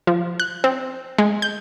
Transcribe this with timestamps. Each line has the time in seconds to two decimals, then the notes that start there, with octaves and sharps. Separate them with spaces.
0.07 F3
0.40 F#6
0.64 C4
1.18 G#3
1.42 G6